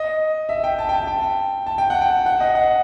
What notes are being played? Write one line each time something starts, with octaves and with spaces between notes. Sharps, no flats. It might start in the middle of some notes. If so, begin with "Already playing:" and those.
Already playing: D#5
E5
G5
A5
G5
A5
G5
A5
G5
F#5
G5
F#5
D#5
F#5